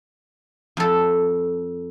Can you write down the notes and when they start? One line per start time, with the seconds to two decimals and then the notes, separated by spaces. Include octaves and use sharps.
0.77 F2 A4